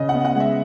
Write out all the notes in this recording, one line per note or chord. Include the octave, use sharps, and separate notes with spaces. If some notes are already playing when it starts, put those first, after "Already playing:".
Already playing: C#3 D#5
F#5
B3
F#5
G#3 E5